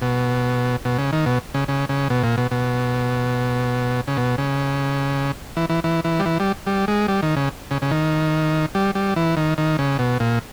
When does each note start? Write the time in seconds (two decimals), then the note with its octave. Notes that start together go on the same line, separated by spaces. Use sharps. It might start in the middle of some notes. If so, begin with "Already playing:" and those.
0.02 B2
0.85 B2
0.98 C#3
1.13 D#3
1.26 B2
1.54 C#3
1.68 C#3
1.89 C#3
2.10 B2
2.23 A#2
2.37 B2
2.51 B2
4.08 C#3
4.17 B2
4.38 C#3
5.57 E3
5.70 E3
5.84 E3
6.04 E3
6.19 G3
6.25 E3
6.40 G3
6.67 G3
6.88 G#3
7.08 G3
7.23 D#3
7.36 C#3
7.71 C#3
7.82 C#3
7.91 D#3
8.75 G3
8.95 G3
9.16 E3
9.37 D#3
9.58 D#3
9.79 C#3
9.99 B2
10.20 A#2